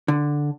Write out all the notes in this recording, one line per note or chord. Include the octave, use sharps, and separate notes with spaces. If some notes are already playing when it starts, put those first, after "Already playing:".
D3